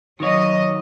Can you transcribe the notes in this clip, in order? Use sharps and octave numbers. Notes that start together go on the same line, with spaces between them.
D#3 F#3 C#5 D#5